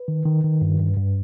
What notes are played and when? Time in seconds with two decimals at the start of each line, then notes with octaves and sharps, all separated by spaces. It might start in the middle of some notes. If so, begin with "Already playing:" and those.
Already playing: B4
0.08 D#3
0.26 D#3
0.44 D#3
0.61 G2
0.80 G2
0.97 G2